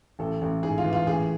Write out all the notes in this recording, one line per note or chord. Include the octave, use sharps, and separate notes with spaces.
A1 A4
A1
G#2 G#4
F4
E3
F4
A1 G#4